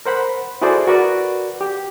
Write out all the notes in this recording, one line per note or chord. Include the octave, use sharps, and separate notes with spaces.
A#4 C5 F#5 B5
E4 F#4 G#4 A4 C5 D5
F#4 A#4 B4 D5
G4